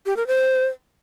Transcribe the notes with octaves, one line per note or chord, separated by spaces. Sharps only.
G4
A#4
C5